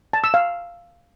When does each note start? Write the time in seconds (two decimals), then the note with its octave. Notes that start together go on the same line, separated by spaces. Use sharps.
0.13 A5
0.24 E6
0.34 F5